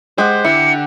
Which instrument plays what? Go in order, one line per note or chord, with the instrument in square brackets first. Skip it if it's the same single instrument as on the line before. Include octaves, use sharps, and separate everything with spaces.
[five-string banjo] G#3 [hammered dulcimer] G4 F#5 [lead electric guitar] C5
[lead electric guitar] D3 [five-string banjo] E4 [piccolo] C#7